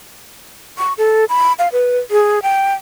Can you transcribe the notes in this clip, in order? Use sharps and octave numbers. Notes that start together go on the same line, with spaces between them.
C#6
A4
B5
F5
B4
G#4
G5